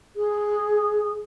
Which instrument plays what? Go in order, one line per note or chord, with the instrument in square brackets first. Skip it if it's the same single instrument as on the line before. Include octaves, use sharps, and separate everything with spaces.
[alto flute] G#4